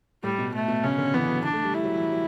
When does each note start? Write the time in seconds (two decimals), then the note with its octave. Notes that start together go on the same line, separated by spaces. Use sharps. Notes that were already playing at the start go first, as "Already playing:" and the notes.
0.23 A2 G3
0.38 B2
0.54 A3
0.68 B2
0.83 C#3 C#4
0.98 D3
1.14 E3 B3
1.29 F#3
1.45 D4
1.53 A3
1.64 G3
1.74 E4
1.84 F#3
1.98 E3
2.12 F#3